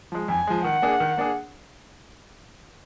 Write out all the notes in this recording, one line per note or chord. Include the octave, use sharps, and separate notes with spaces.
F3 G#3
F2 G#5
F3 G#3
D#3 F#5
A#3 D4 G#4
D#3
A#3 D4 G#4